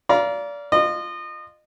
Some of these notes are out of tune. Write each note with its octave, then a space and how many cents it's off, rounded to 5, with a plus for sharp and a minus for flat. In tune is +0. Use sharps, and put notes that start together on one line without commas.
D5 -25 F5 -15 A#5 +25
F4 +0 D#5 -30